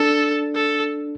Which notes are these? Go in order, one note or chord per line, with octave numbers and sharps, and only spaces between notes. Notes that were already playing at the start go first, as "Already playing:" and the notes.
Already playing: D4 A4
A4